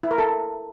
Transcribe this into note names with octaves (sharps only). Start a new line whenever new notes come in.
E4
A#4
A4